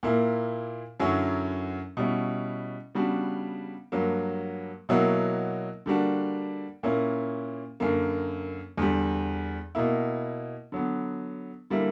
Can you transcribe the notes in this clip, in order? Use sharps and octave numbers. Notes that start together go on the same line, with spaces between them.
A#2 A#3 E4
F#2 D3 F#3 C#4 E4
B2 G3 C#4 E4
C#3 G3 B3 D4 F#4
G2 F#3 A#3
B2 F#3 A#3 E4
D3 G3 A#3 D4 F#4
A#2 A#3 C#4 E4
F#2 D3 A#3
E2 D3 G3
B2 A#3 E4
D3 F#3 B3
D3 G3 A#3 E4